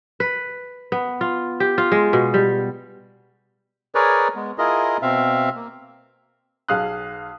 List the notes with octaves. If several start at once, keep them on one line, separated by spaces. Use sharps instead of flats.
B4
B3
F4
G4
F4
G#3
B2
G3
G#4 A#4 B4 C#5 D5
G#3 B3
E4 F4 G#4 A#4 D#5
B2 C4 E5 F5
A#3
B1 G#4 F5 D#6 F#6